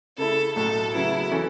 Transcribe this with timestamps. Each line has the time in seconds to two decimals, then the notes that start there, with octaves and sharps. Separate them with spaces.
0.18 C#3 A3 E4 A4
0.55 B1 A2 F#3 A4
0.94 C#3 F#3 B3 E4
1.31 E3 C#4 A4